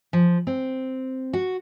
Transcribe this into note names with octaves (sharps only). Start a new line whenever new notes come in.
F3
C4
F#4